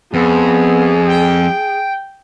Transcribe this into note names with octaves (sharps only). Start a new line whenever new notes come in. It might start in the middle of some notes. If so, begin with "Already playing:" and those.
F2 B3 G#4
G5